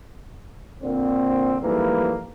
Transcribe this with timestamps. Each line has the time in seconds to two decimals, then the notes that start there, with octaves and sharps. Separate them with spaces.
0.82 A#2 D3 A#3 C4
1.62 G#2 E3 F3 G3 A3 A#3